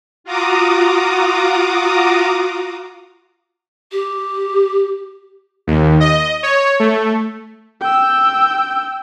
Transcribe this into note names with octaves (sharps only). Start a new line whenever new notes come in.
F4 F#4 A#5 D6 D#6
G4
D#2
D#5
C#5
A3
G5 E6